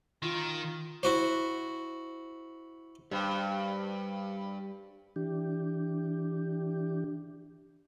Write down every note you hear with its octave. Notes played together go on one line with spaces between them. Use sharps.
D#3 F4
E4 F#4 C5
G2 G3 C5 G5
E3 D4 G4